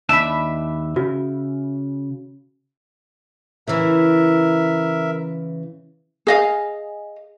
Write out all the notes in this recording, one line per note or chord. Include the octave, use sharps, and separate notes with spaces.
D#2 D4 E5 A5 B5
C#3 F#4
C#3 E3 A#4 E5
G#4 D#5 F5